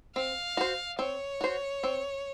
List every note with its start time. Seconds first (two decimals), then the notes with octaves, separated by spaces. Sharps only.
0.16 C4 F5
0.57 F#4 C5
0.99 C4 C#5
1.41 F#4 C5
1.83 C4